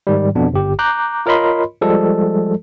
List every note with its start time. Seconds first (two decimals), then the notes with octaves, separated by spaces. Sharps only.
0.07 G#2 D#3 G3
0.35 F2 B2 B3 D4
0.53 G1 G4
0.79 A#5 D6 F#6 G6
1.26 F4 A#4 C#5 D#5 B5 C6
1.81 F3 G3 G#3 A4